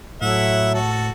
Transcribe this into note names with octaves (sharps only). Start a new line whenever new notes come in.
A2 F#3 A3 E4 E5 F#5
F#4 A4